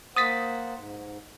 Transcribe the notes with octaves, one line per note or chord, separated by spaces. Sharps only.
A#3 C5 F#5 D#6 A6 B6
G#2